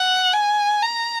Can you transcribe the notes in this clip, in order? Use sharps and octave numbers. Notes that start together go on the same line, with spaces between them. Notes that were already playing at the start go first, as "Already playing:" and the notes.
Already playing: F#5
G#5
A#5